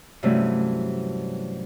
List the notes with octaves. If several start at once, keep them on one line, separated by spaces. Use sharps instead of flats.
G2 C3 E3 F#3 A3 C#4